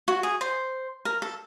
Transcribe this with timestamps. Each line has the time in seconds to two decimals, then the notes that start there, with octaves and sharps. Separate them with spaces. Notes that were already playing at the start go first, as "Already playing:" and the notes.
0.08 F#4
0.23 G#4
0.41 C5
1.05 A#4
1.22 A4